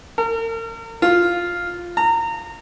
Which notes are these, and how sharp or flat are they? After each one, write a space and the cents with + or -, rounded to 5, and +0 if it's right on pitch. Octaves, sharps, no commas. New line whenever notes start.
A#4 -40
F4 +0
A#5 -25